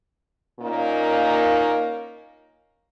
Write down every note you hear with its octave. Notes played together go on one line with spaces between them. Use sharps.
A#2 A#3 C#4 D#4